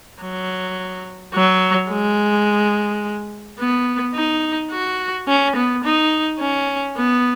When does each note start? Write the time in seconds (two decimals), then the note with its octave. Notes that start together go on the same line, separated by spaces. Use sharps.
0.21 F#3
1.34 F#3
1.90 G#3
3.59 B3
4.15 D#4
4.72 F#4
5.28 C#4
5.56 B3
5.84 D#4
6.40 C#4
6.97 B3